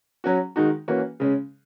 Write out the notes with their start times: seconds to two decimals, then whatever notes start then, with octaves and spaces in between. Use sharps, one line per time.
0.24 F#3 C#4 F#4
0.56 D#3 G#3 D#4 F#4
0.88 E3 A#3 C#4 F#4
1.20 C#3 G#3 C#4